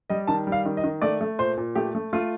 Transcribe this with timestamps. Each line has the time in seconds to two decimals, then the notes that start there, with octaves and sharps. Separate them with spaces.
0.10 G3 D#5
0.27 D#3 A5
0.47 G3
0.52 F5
0.66 D#3
0.77 D#5
0.84 D#3
1.02 A3 D5
1.21 A3
1.38 A#2 C5
1.57 A#2
1.75 A3 G4
1.95 A3
2.13 A3 F4